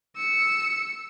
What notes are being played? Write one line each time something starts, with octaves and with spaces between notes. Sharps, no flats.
E6 C#7